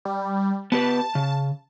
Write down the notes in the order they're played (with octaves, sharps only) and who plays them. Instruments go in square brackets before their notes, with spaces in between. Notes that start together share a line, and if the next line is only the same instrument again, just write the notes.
[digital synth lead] G3
[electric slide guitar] B3 G4 B4 [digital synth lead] A5
[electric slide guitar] C#3